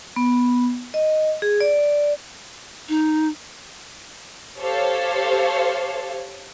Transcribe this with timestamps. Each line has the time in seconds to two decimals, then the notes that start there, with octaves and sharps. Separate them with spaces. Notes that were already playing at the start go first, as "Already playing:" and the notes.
0.16 B3
0.94 D#5
1.42 G#4
1.61 D5
2.89 D#4
4.60 G4 A4 C5 C#5 F5